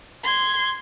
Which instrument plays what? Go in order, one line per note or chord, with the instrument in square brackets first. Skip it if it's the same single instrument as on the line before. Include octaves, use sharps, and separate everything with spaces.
[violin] C6 G#6